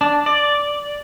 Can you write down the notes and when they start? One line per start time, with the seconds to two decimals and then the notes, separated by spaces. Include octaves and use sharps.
0.01 D4
0.26 D5